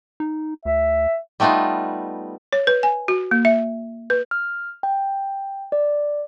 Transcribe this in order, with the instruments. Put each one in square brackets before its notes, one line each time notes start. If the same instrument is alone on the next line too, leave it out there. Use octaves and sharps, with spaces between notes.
[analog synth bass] D#4
[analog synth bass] D2 [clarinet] E5
[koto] G3 A3 B3 D#4 F4
[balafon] C#5
B4
G#5
F#4
A#3
E5
B4
[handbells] F6
G5
D5